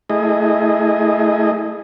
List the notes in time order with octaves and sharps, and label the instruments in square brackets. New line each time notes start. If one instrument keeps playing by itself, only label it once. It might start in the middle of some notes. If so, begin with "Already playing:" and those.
[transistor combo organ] A3 E4 G#4 D#5